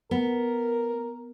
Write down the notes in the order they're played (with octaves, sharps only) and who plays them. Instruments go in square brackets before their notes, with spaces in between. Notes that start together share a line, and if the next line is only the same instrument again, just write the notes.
[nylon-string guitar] B3 [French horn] A#4